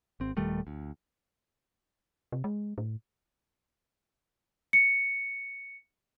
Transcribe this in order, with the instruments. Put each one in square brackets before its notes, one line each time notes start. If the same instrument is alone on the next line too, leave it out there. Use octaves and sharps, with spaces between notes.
[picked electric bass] G#1 C4
D#1 D#3 G3 A3
D2
[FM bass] C3
G#3
A2
[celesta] C#7